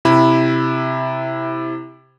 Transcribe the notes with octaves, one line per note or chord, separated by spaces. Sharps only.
C3 E4 B5